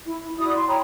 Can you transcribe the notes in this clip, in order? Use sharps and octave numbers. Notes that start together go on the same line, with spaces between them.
E4
E4 F#4 D5 D#6
C6
C#5 G5 A#5 B5